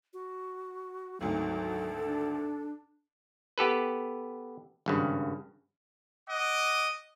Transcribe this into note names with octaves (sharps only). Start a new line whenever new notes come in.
F#4
G#1 D2 F#3 A4
D4
B3 G4 A4 B4
G#1 G2 C#3
D#5 F#5 D6